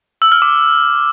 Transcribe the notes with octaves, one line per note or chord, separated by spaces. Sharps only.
E6
F6
D6